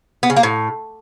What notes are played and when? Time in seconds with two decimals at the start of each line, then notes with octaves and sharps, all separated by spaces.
0.23 B3
0.30 C#3
0.36 A#3
0.43 A2